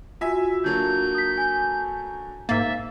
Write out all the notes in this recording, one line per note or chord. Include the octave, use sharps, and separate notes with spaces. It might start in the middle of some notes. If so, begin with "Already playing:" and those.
F4 F#4 E5 G#5
D3 F#3 A#3 G6
D#6 B6
G#5
G#2 A#3 E5 A6